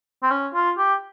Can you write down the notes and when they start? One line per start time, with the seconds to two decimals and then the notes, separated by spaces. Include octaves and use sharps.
0.23 C4
0.31 C#4
0.54 F4
0.78 G4